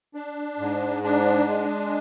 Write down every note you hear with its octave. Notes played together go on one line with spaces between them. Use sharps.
D4
G#2
D4
G#3